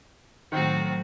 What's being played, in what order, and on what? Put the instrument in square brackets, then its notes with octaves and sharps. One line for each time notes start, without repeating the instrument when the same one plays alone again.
[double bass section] A2 F#3 A3 [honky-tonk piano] D#3 [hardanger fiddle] C4 F#4